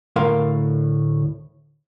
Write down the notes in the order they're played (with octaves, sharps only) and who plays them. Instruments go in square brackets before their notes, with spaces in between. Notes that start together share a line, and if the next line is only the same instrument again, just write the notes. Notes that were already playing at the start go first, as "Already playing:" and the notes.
[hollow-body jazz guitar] D2 A2 A#4 F5 C6